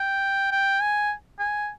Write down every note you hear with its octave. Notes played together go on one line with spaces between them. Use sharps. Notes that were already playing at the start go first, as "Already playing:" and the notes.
Already playing: G5
G5
G#5
G#5